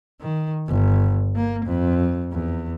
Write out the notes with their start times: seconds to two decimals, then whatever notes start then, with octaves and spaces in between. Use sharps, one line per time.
0.21 D#3
0.68 G1
1.36 A#3
1.66 F2
2.32 E2